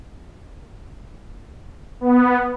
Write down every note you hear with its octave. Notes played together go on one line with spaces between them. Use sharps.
B3